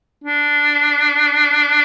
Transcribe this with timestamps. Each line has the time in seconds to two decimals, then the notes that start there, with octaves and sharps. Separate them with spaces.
0.24 D4